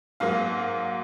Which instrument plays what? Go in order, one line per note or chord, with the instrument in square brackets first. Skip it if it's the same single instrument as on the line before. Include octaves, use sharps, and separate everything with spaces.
[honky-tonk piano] G#2 F#3 A#3 F5